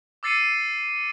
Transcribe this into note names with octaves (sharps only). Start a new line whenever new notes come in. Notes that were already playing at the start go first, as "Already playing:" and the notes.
D6 E6 A6 C7 C#7 D#7